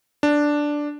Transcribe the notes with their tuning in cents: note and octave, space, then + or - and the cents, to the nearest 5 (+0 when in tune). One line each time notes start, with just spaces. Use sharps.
D4 +0